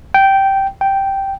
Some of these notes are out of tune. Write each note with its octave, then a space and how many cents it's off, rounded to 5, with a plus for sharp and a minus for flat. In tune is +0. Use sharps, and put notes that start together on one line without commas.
G5 -10
G5 -5